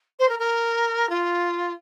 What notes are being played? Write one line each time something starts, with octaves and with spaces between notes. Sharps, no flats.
C5
A#4
A#4
F4